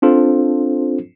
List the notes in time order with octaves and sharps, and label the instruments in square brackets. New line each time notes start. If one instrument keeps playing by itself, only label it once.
[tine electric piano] C4 D4 F4 A4 C5